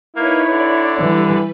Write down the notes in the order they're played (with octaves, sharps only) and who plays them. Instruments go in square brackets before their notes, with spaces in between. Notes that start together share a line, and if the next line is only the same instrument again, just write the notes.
[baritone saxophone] A#3 [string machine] D#4 B4 C#5 [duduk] E4
[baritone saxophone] D3 [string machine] C#5 D5
[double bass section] E3 [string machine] G3 B4